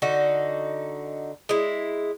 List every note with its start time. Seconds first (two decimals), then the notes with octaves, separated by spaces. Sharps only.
0.02 D3 D#4 F#4
1.49 G#3 E4